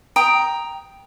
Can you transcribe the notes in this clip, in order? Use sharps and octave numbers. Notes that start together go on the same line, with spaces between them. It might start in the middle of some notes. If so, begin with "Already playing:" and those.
G5 A#5 D#6